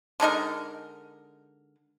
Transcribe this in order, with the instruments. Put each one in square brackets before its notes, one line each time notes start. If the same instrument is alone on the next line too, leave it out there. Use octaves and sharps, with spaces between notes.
[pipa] D3 G#3 D#4 A#4